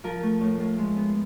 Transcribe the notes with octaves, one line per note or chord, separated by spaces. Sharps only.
F3 A#4
A3
A2
A2
G#3
B3